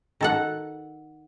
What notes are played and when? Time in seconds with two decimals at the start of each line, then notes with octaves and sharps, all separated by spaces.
0.21 D#3 A4 F#5